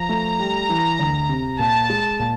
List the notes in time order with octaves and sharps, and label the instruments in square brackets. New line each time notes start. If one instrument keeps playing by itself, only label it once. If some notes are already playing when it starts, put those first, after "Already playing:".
Already playing: [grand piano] F3 [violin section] A#5
[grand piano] A3
G3
E3
D2
C3
[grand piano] A#2 [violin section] A5
[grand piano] G#3
A#2